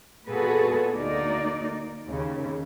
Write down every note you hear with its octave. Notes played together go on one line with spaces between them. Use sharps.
A#2 B3 F#4 G#4 A4 B4
D2 A#3 D#4 D5
D#2 C#3